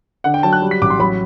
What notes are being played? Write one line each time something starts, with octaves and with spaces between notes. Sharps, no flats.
D3 F#5
G5
F#3 A5
F#6
G3
B6
A1 D6
C6
F#3 B5